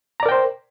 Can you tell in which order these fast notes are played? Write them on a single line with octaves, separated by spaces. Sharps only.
A#5 D5 A#4 G5 C5